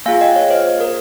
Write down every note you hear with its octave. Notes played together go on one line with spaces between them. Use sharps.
A#3 F4 G#4 F5 G#5
D#5 G5
C#5 F5
C5 D#5
A#4